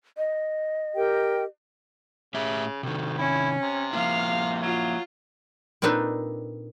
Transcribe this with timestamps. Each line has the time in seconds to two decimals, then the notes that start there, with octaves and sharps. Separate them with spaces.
0.17 D#5
0.95 G4 A#4 G5
2.34 A2 C#3 G4 E5
2.83 D2 C3 D#3
3.18 C#4 E4
3.62 C3
3.93 F3 A#3 E4 F5
4.62 F#3 F4
5.82 A#2 C4 D4 D#4 A4 B4